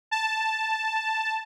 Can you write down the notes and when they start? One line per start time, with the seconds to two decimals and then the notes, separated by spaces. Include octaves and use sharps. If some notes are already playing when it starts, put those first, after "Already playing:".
0.11 A5